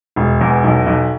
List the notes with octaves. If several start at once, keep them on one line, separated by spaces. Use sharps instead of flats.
E1
E2
B1
B1